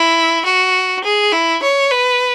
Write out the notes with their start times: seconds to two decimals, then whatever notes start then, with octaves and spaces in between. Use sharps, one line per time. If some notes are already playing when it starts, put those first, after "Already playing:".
Already playing: E4
0.46 F#4
1.04 G#4
1.32 E4
1.62 C#5
1.91 B4